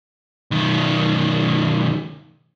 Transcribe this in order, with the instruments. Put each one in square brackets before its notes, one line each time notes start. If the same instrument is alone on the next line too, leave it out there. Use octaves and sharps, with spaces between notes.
[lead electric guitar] B1 D#3